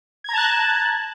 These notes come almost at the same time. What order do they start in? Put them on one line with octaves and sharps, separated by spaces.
G#6 A#5 A5 F#6